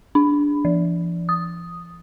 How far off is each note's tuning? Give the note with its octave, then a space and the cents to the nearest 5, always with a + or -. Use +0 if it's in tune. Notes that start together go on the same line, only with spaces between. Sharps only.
D4 -10
F3 -45
D#6 +0